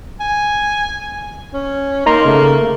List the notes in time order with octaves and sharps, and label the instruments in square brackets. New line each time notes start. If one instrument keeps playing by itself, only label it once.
[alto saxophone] G#5
C#4
[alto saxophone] A#3 [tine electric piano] D#4 A#5 C6
[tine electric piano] C#3 A3